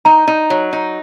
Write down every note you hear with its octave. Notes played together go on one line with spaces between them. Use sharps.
D#4 A#5
D#4
F#3
D#4